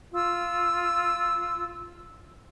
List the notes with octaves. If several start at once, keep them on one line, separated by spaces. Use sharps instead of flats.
F4 E6